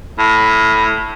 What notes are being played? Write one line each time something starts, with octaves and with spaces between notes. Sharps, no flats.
A2